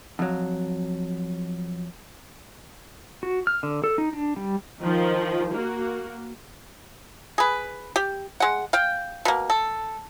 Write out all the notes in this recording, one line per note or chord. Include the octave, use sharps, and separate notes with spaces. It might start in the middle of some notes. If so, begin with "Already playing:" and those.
F2 F#3
F#4
F6
D3
A4
D#4
D4
G3
D#3 F3
A#3 F#4
G#4 B4
G4
G#3 F#5
F5 G5
B2 A#3
A4